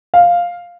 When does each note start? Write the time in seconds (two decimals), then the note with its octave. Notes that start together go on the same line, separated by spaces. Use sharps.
0.14 F5